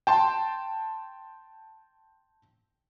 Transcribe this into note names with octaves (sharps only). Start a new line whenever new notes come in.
G5 A5 C6